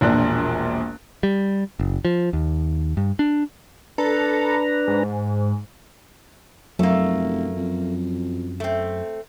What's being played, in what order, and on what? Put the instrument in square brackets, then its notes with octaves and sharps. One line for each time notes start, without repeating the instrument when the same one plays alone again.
[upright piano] E1 A#1 A#2 D4 F#6
[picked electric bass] G3
F#1
F3
D#2
G2
D4
[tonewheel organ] D4 B4 A#5 [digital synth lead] A4
[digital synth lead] G#2
[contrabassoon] F1 [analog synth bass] F#2 [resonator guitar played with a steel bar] A3 A#3
[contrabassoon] F2
[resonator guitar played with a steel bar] A3 C4